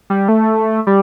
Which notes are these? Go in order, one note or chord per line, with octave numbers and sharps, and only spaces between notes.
G3
A3
G3